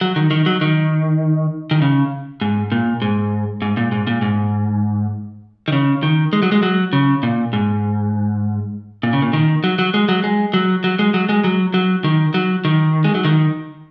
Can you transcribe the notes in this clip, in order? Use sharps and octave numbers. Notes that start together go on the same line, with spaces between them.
F#3
D#3
D#3
F#3
D#3
D#3
C#3
G#2
A#2
G#2
G#2
A#2
G#2
A#2
G#2
D#3
C#3
D#3
G#3
F#3
G#3
F#3
C#3
A#2
G#2
A#2
C#3
A#2
D#3
F#3
F#3
G#3
F#3
G#3
F#3
F#3
G#3
F#3
G#3
F#3
F#3
D#3
F#3
D#3
G#3
F#3
D#3